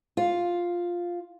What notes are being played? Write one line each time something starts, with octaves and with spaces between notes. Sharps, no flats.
F4